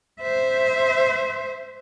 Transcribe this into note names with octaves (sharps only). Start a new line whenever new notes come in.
C5 E5